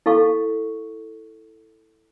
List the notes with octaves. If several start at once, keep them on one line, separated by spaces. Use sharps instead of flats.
E4 A4 F5 C#6